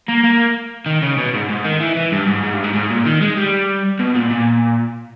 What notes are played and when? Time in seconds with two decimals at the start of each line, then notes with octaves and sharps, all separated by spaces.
0.08 A#3
0.24 A#3
0.86 D#3
1.02 C#3
1.18 B2
1.34 G#2
1.49 G#2
1.64 D#3
1.80 E3
1.96 E3
2.12 G2
2.27 G#2
2.43 G#2
2.54 G2
2.64 G#2
2.74 G#2
2.90 A#2
3.06 D#3
3.21 G#3
3.37 G3
4.00 B2
4.15 A#2
4.31 A#2